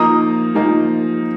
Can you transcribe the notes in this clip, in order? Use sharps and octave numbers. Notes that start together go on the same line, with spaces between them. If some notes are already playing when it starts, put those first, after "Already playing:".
Already playing: F3 A#3 D#4 A#5 D#6
F3 A#3 D#4